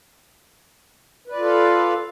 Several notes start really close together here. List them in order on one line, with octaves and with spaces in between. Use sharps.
B4 D5 F4 A4 F5